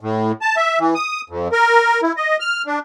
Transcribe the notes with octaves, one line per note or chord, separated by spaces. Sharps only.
A2
A5
E5
E3
D#6
F2
A#4
E4
D#5
F6
D4